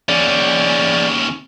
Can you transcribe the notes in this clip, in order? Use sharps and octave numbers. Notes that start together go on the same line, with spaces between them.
D#2 C#4 G#4 D5